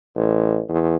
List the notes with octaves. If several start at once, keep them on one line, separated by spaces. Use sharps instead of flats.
A1
E2